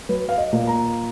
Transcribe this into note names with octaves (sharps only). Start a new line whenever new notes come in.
F#3 B4
F5
D#5
A#2
A#5